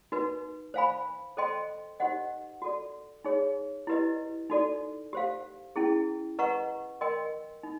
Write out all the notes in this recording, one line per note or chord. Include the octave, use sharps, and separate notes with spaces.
D#4 F#4 B4
C5 F5 G#5 B5
A4 C5 D#5 G5 C6
D#4 G4 C5 D#5 F#5
F#4 A4 D5
D#4 G#4 C#5
E4 G4 B4 D#5
D#4 F#4 A4 D5
G4 C5 F5
C#4 E4 G#4
B4 D#5 F#5 A#5 C#6
A#4 D#5 G5 C6
D#4